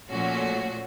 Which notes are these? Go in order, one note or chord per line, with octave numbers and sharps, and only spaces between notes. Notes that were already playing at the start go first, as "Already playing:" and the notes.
A#2 F3 A3 C#4 F#4